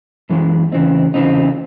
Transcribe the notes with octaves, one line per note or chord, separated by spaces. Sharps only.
F#2 E3 G#3
E2 C#3 E3 C4 D#4
E2 C#3 E3 C4 D#4